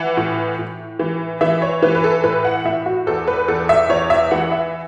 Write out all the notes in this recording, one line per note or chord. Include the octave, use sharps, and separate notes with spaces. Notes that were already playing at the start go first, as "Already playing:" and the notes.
Already playing: E3 F#5
A2
A2
E3
E3 E5
C#5
E3 B4
B4
A4
A2 B4
F#5
A2 E5
F#4
E2 A4
B4
E2 A4
E5
E2 C#5
E5
E3 F#5
E5